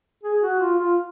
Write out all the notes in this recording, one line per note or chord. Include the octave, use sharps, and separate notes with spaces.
G#4
F#4
F4
F4